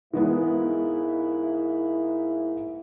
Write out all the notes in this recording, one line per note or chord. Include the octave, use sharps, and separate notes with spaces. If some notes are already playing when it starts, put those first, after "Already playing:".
G#2 E3 G#3 A#3 B3 E4